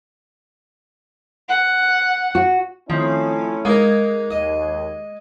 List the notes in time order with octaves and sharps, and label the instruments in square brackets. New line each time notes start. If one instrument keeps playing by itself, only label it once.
[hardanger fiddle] F#5
[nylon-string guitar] F#4
[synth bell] D#3 C4 [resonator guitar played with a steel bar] F3 [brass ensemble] A3 C#4 E4
[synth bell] G#3 G#6 [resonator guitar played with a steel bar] A#3 [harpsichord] D#4 A#4
[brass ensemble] D#2 [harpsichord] D#5